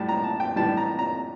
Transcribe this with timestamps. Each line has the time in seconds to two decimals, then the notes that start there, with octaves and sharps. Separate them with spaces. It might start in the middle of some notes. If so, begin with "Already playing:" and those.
Already playing: A2 G3 A5
0.09 A#5
0.24 A5
0.40 G5
0.56 A2 E3 G3 A5
0.77 A#5
0.99 A#5